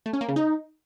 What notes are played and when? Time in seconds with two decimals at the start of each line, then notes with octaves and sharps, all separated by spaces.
0.06 A3
0.13 C#4
0.21 A#3
0.28 C#3
0.36 D#4